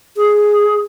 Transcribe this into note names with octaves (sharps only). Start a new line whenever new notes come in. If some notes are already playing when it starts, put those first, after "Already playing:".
G#4